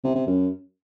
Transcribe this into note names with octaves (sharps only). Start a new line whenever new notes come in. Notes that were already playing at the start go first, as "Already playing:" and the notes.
C3
C3
F#2